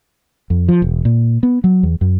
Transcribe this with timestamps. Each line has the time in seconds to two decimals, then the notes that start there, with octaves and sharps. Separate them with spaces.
0.50 F2
0.68 F3
0.82 E1
1.05 A#2
1.43 B3
1.64 F#3
1.83 E2
2.01 F#2